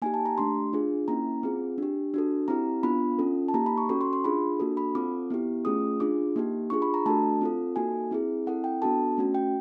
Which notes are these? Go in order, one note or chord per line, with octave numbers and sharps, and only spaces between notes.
A#3 D#4 G4 G#5
A5
A#5
A3 D4 G4 C6
D4 F4 G#4
A#3 C#4 E4 A#5
C4 F4 G#4
D4 G4
D4 F#4 A4
C4 E4 G4 A#5
B3 D4 F4 B5
C#4 F4 A4
A5
A#3 D#4 G4 A#5
B5
C#6
C#4 F#4 A4 C#6
C6
C6
D4 F4 G#4 B5
A#3 D4 F#4 A4
B5
C4 F4 A4 D6
B3 E4 G4
A3 C#4 F4 G#4 D#6
D4 F4 G#4 D6
A#3 D#4 G4
D4 F4 G#4 C#6
B5
A#5
A3 D4 F#4 A4 A5
C4 F4 A4
A#3 D#4 F#4 A4 G#5
C4 E4 G#4
C4 E4 A4 F#5
G5
B3 D4 F#4 A4 A5
A3 C#4 F#4
G5